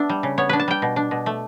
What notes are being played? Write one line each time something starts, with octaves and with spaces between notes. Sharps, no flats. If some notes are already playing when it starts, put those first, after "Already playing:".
Already playing: B3 D4 E5
G3
C#3
B3 C#5
D4 B4
A5
G3 G5
B2
D4
B2
A3